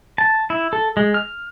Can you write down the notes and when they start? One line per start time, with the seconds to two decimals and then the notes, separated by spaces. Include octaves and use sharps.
0.18 A5
0.50 E4
0.73 A4
0.97 G#3
1.14 F6